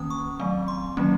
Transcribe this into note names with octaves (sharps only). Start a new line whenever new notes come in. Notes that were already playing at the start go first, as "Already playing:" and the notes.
Already playing: D#3 A#3 C#4 D#6
C#6
F#3 A3 C4
C6
D#3 F#3 A#3 C#4